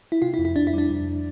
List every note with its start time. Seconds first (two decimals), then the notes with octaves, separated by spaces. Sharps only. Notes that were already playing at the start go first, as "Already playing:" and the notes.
0.12 E4
0.22 C3 F4
0.34 E4
0.39 F2
0.45 E4
0.56 F2 D4
0.67 E4
0.73 G3 D4
0.90 F2